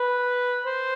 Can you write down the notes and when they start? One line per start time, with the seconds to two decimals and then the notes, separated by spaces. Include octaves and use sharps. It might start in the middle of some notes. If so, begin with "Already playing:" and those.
Already playing: B4
0.66 C5